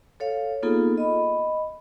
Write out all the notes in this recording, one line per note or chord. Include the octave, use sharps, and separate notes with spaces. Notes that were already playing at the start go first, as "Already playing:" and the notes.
A4 C#5 F5
A#3 B3 D#4 F4 G#4 A4
D#5 B5